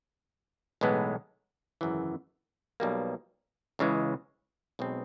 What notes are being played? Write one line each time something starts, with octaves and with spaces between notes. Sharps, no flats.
B1 A2 E3 G#3 B3
G#1 F#2 C#3 E3
B1 B2 G3 A#3
C#2 C#3 E3 G#3
B1 B2 G#3 C4